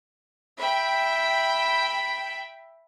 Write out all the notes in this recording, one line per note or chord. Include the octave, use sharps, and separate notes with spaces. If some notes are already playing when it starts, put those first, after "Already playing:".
E5 G5 B5